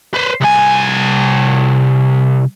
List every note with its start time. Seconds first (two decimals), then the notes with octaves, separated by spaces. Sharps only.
0.15 B4 C5
0.41 C2 G#5